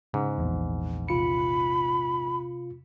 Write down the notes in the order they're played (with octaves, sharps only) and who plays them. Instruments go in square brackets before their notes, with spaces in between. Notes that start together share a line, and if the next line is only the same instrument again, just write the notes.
[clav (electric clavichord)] G#2 [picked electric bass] C#3
[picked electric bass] A#1 E2
[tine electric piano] C3 F4 C#7 [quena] B5